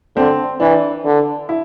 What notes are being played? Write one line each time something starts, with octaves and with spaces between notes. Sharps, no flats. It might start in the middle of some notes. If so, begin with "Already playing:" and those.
D3 C4
E3 D4
D3
E4